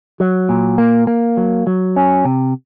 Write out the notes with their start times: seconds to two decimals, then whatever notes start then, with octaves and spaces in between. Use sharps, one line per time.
0.20 F#3
0.49 A#2
0.78 A#3
1.07 A#3
1.37 F#3
1.67 F#3
1.96 C#4
2.25 C3